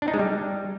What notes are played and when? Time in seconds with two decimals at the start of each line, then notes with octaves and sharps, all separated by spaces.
0.02 D4
0.08 D#4
0.14 G#3
0.19 G3